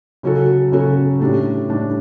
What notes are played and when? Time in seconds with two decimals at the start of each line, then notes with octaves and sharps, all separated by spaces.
0.23 C#3 F#3 C#4 F#4 A4
0.72 C#3 F#3 C#4 F#4 A4
1.20 A2 G3 D4 G4
1.69 A2 G3 D4 G4